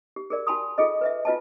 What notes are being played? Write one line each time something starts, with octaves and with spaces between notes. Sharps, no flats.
G4
G#4 A#4 D5
F#4 G#5 A5 B5 C6 D#6
F4 G#4 A4 D#5
B4 D#5 E5
F4 F#4 B4 D#5 G#5 A5